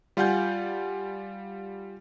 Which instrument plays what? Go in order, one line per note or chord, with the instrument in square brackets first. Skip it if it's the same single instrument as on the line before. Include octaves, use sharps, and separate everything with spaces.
[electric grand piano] G3 F4 F5 F#5 G#5 G6